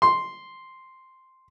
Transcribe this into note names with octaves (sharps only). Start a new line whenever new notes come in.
C6